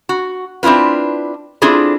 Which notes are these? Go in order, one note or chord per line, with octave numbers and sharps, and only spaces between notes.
F#4
C4 D4 E4 F4 B4
C4 D4 E4 F4 G#4 A4